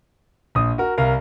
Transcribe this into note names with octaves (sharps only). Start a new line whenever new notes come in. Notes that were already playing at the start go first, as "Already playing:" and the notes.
A#1 D#6
F#4 A#4
C2 A#4 F5